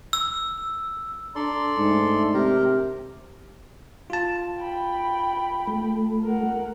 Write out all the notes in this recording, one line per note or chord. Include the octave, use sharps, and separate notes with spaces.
E6
D4 A4 D5 A#5 C6
G#2 A3 D4
C3 G4 A#4 A#5
F4 A5
G5 B5
A3
A#4 F#5